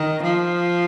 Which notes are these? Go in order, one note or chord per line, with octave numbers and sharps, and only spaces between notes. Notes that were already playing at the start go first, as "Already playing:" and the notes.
Already playing: D#3
F3